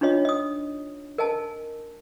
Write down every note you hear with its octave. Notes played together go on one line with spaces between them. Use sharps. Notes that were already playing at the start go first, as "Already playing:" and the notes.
D4 D#4 F4 C#5 D#5
D#5 D#6
A#4 D#5 G#5 A5